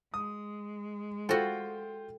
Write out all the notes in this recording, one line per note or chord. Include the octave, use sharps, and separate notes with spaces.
G#3 D#6
F4 F#4 A4 C5 G5